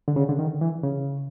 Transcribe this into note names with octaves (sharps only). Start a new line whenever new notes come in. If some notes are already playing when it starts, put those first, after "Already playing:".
D3
C#3
D3
D#3
E3
C#3